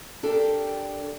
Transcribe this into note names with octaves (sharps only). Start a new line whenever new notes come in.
D4 G4 A4 A#4